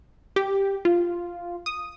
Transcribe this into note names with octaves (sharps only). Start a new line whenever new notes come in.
G4
F4
D#6